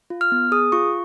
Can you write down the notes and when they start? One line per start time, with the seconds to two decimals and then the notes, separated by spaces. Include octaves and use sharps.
0.10 F4
0.21 F6
0.32 B3
0.52 G#4 D#6
0.72 F4 C#6